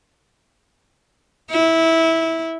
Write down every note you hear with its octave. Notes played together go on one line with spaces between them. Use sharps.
E4